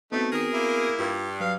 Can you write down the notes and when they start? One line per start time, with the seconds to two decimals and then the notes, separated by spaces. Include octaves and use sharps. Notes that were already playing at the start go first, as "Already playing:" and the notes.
0.12 A3 B3 C4 D#4 F#4
0.32 D#3 G#4 A#4
0.54 A#3 E4
0.99 G2 F4
1.40 F#3 B4 F5